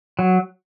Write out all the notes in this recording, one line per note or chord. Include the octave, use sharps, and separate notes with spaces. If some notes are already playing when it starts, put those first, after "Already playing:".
F#3